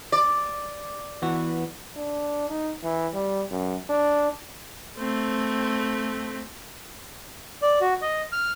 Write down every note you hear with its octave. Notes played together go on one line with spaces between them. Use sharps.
D5
E3 B3 F#4
D4
D#4
E3
G3
F#2
D4
A3 C4
D5
F#4
D#5
F6